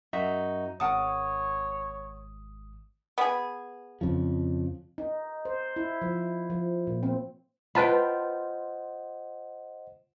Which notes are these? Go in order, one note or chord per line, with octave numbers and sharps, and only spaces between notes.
F#2 D#4 F#4 E5
G#1 A#4 C#5 F#5 A5 D#6
B3 G#4
F2 C#3 F3
D#4
C5
E4
F3
F3
A#2
C4
F4 B4 C5 D#5 F#5 G5 A5 B5